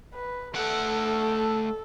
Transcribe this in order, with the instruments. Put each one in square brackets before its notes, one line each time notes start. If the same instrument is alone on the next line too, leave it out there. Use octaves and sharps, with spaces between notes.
[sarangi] B4
[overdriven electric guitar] A3 F#5 [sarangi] A4